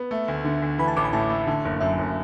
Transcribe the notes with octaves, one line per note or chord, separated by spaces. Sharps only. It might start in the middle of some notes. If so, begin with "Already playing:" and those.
Already playing: B3
A3
D2
D3
D2
E3 B5
A5
A1 D6
B5
A2 A5
A3
D3
F#1
F#2 E5
F#1